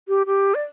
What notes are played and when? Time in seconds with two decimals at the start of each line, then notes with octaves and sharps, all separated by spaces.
0.08 G4
0.27 G4
0.55 D5